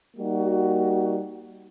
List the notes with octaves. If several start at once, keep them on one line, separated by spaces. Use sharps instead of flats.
G3 A#3 D#4 F#4